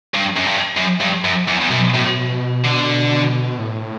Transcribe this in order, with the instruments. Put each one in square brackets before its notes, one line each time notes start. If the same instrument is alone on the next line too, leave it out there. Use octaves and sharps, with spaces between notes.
[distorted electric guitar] G2
F#2
G2
F#2
G2
F#2
E2
E2
[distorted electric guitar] F#2 [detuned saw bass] B2
[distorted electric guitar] A2
D3
[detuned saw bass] A2